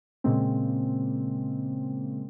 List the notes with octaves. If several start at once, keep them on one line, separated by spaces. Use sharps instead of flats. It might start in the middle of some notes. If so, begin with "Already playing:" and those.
A#2 C#3 G#3 A#3 C4